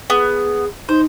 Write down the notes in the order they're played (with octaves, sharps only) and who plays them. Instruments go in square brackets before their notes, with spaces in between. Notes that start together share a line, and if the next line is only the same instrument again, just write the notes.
[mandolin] B3 [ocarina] G#4
[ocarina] D#4 [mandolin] C5